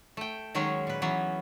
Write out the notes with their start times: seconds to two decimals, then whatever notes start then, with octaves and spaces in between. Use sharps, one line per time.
0.17 A3 G5
0.55 D#3 F#3 G#3 C#4 G#4 C#5
0.87 A#2 B4
1.02 E3 F#3 B3 C#4